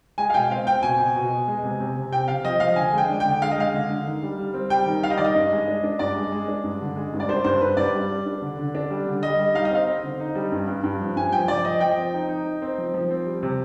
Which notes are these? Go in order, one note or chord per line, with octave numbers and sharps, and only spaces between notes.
G#3 G#5
F5
B2 G5
C4 F5
C4 G5
B2 G#5
B2
B2
B2
G#3
C3
C3
C3
C3 G5
C3 F5
F3 D#5
F3 F5
D3 G#5
G#3 G5
D4
G5
D3
G#3 F5
D#5
G#3 F5
D3
D3
D#3
G3
G3
C4
G3 G5
D#3
G3 F5
D#5
D#3 D5
D#5
G2
G#3
D4
D4
G2 D5
G#3
G#3
D4
G2
D3
G#3
G2
D5
D4 C5
G2 C5
G2 B4
G2 D5
G3
D4
D4
D3
D3
D4
G3
D3
G3 D#5
G3
D#4 F5
D#5
C4 F5
C4
D3
D#4
G3
G2
G2
G2
F3
G2 G#5
F3 G5
F3 D5
F3 D#5
F3 G5
C4
D#4
D#4
D#4
C4
F3
F3
C4
G3
C3